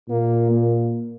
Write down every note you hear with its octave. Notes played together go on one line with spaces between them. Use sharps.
A#2 A#3
A#3